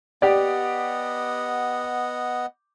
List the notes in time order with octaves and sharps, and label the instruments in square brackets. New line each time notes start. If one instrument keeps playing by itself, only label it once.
[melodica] B3 D#5 F#5 [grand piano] G4 D5